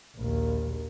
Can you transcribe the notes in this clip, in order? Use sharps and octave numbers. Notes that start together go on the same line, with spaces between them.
A#1 D#2